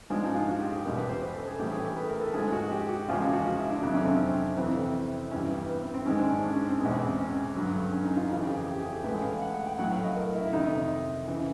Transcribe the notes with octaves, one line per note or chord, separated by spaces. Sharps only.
G#2 F3 G#3 D4
D#4
F4
F#4
G4
G#4
E2 B2 G3 A#4
B4
C5
C5
A4
G#4
A2 E3 G3 G4
G#4
A4
B4
A#4
A4
G#2 F3 G#3 G#4
F#4
G4
F#4
E2 C#3 F3 G#3 F4
F4
F#4
F#4
E4
D4
F2 C3 D#3 F#3 D4
C#4
C4
C#4
F2 C3 E3 C4
G2 E3 G3 C#4
B3
B3
C4
C4
G#2 D#3 G#3 C#4
D4
C#4
C#4
C#4
C4
E2 B2 G#3 B3
C4
C#4
G2 D3 F#3
C#4
D#4
F4
F2 C#3 E3
G4
G#4
G4
G#4
A4
A2 E3 G#3 B4
F5
F#5
F#5
G5
A2 F#3 F#5
F5
D#5
A#4
E4
E4
F2 C3 D#3 D#4
C#3 E3